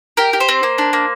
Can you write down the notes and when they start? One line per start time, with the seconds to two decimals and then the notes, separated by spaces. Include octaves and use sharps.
0.17 G4 A#4
0.33 G4
0.40 C5
0.48 C4
0.63 A#3
0.78 D4
0.93 A#3